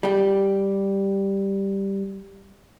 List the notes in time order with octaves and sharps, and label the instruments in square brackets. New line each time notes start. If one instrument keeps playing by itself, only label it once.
[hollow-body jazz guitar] G3 G4